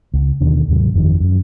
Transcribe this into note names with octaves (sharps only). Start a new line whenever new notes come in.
C#2
D#2 B2 D3 D#3
D#2 G#2 C3 F#3
G1 F2 D#3
F#2